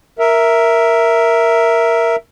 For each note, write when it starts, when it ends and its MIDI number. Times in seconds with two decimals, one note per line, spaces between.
0.19 2.16 70
0.19 2.16 76